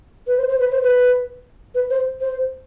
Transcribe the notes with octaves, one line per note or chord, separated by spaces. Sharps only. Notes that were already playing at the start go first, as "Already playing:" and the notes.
B4
C5
C5
B4
C5
B4
B4
C5
C5